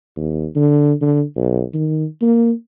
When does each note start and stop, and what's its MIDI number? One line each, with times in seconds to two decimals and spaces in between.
0.17 0.46 39
0.56 0.93 50
1.01 1.23 50
1.36 1.63 35
1.74 2.05 51
2.22 2.52 58